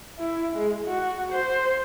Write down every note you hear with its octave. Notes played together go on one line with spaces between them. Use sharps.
E4
G#3
F#4
C5